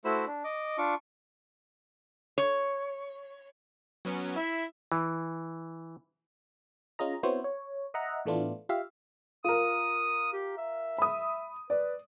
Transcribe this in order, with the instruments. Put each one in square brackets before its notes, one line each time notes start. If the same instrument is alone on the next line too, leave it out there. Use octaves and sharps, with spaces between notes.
[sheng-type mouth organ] A3 E4 F#4 C5 B5 E6
D4
D#5 D6
D4 F4 C#6 D6
[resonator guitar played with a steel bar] C#5
[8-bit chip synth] F#3 B3 C#4
[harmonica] E4 [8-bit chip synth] E5
[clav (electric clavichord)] E3
[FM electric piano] C#4 F4 G#4 D#5 A#5
B3 C4 E4 F#4 C5 C#5
C#5
D#5 E5 F#5 A#5
A2 E3 A3 B3 D4 F4
F4 G4 E5 F5
[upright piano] F4 A#4 [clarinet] D#6
[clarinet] G4
E5
[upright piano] B5 D#6
[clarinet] B4 [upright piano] D5